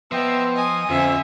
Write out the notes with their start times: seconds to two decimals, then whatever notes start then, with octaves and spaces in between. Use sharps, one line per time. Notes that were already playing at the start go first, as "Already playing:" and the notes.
0.12 F3 B3 D#5 E5 G5 E6
0.56 D#5 G#5 D#6
0.90 F2 D3 F3 C#4 E5